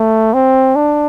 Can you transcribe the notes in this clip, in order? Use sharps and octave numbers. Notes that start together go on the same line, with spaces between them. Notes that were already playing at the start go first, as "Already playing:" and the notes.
Already playing: A3
C4
D4